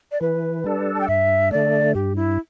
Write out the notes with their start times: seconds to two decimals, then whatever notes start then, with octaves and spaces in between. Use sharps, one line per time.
0.12 D5
0.21 E3 B4
0.64 G3 D4 A4
0.94 A5
1.01 G5
1.08 G2 E5
1.51 D3 A3 D5
1.95 G2 G4
2.16 E4